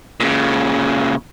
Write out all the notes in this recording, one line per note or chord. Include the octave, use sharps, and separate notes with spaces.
A#2 C#3